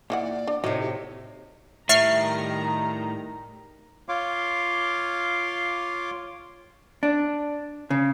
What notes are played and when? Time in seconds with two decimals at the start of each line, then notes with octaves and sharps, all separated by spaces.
0.10 A#2 D#3 E3 D5 F#5
0.48 D4
0.64 A2 C3 D#4 F#4 C#5
0.80 G4
1.89 A2 D#3 G3 E5 A#5 C#6 F6 C7
4.09 F4 C#5 F5 C6 D6
7.03 D4
7.90 C#3